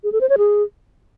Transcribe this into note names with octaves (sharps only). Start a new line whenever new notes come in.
G#4
A4
C5
C#5
G#4